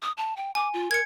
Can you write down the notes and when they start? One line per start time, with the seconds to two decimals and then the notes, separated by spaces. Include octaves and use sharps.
0.02 D#6
0.17 A5
0.36 G5
0.55 G#5 D6
0.74 F4
0.91 A#4 G#6 C#7